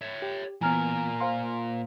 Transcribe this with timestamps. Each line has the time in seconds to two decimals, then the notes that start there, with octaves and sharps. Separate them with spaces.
0.01 C#5 E5
0.22 G4
0.61 A#2 E3 B3 A#4 G#5 A#5 F6
1.20 C5 F5 C6